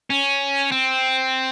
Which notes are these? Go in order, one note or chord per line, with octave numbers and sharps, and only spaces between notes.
C#4
C4